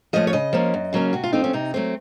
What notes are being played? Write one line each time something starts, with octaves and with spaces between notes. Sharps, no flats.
F3 A3 C#4 D#5
C#5
C#3 D#5
F3 A#3 C#4
F#2
C#3 F#3 A#3 C#4
C3 F#4
F4
F3 A3 C4 D#4
C#4
C3 D#4
F#3 A3 C4